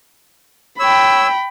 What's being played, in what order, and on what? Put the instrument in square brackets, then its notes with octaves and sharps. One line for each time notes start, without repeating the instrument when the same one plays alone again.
[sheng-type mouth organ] C#5 E6 [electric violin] G5 B5